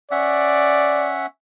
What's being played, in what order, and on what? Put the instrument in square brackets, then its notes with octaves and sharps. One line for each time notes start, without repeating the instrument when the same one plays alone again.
[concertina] C#4 E5 F#5 [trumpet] D5